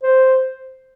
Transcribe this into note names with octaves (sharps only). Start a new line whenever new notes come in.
C5